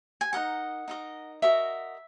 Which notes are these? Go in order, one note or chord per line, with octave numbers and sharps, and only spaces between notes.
G#5
D#4 A#4 D#5 F#5
D#4 A#4 D#5
F#4 A#4 D#5 E5